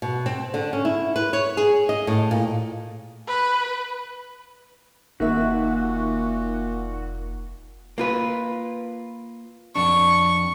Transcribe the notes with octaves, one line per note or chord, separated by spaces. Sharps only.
B2
C4
D3
C#4
E4
B4
C#5
G#4
D#5
A2
A#2
B4
F1 A#2 D#3 A#3 F#4 E5
A#3 F4 B4
F2 D4 C#6